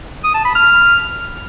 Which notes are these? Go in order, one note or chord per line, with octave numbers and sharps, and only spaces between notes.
D#6
A5
B5
F6